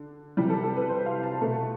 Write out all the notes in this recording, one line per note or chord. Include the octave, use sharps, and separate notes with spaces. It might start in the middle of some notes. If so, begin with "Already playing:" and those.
Already playing: D3
C3 E3 G3 G4
A4
A4
B4
C5
F5
A5
B2 A3 A5